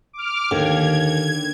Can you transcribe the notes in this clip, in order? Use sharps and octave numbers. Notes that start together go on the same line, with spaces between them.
D6 F6
D#2 D3 G#6